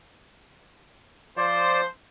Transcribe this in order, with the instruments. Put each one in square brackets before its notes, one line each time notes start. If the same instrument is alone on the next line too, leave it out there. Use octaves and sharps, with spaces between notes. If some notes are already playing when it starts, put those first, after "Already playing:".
[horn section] F3 C5 [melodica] D5